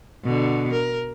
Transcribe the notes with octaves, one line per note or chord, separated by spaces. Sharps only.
B2 D3
A#4